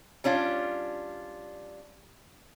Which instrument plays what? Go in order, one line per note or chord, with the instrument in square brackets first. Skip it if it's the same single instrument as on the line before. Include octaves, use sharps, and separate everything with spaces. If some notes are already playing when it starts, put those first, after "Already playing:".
[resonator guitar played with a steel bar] G3 C#4 D4 F4